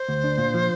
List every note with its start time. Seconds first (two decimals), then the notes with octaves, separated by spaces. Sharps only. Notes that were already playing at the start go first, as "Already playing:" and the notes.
Already playing: C5
0.09 D2
0.24 D4
0.38 A#2
0.54 F3